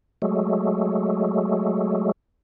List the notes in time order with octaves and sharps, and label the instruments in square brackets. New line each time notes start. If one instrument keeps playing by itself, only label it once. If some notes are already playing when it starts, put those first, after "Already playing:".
[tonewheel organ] F#3 G#3 A3